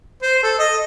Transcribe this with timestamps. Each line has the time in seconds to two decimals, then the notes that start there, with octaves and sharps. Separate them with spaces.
0.22 C5
0.43 A4
0.59 D#5